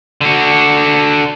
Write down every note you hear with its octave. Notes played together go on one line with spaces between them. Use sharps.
D3 F#4